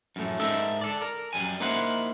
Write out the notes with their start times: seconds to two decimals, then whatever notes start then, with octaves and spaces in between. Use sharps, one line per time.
0.16 F#2 A2 A3
0.40 G#2 D#4 A4 A#4 E5
0.81 A4 D5
1.01 A#4
1.33 F#2 D#3 G3 G#5
1.60 A#3 D#4 E4 C5 F#5